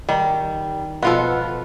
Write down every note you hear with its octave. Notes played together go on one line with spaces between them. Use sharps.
D#3 G3
B2 F3 B3 F4 F#4 A4